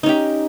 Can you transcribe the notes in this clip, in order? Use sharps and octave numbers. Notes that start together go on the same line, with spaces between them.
C#4 D#4 G4